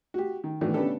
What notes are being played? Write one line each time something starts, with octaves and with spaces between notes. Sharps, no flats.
F#4 G4
D#3
A2 D#3 E3 B3 D4 F#4
C#3 A3 B3 D4 G4 A4